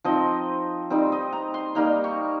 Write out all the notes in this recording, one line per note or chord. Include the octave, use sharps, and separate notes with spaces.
F3 C4 D#4 D#5
G3 C4 D#4
D#5
A#5
C6
G3 A#3 D#4 A#5
C#6